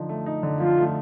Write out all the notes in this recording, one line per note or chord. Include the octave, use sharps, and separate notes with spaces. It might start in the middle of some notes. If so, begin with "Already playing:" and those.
Already playing: D3 F3 D#4
A3
D#4
D3
F3 F4
A3